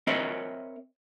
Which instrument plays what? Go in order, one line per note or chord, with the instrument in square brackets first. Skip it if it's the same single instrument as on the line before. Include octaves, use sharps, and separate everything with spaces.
[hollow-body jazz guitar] C4 A#4 C#5 D#5 E5